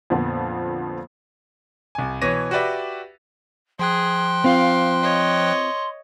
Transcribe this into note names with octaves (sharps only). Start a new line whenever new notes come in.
F2 A#2 D3 F3 B3
C2 G#5
B2 E3 C#5 A#6 D#7
F#4 G4 B4 D5 E5
F3 G#4 G5 C6 F#6
C4 F4 F5
C#5 D#5